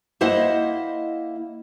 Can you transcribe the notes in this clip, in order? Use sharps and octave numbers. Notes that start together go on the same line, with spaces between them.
A#3 E4 C5 D#5 F#5